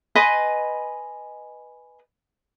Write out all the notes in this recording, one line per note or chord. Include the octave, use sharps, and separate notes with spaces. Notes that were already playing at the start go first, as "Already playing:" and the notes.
B4 D#5 G#5 C6